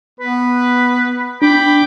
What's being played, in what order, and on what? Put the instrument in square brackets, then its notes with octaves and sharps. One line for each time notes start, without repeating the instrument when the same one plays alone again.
[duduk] B3 [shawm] B4
[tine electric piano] D4 [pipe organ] G5 D6 [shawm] B5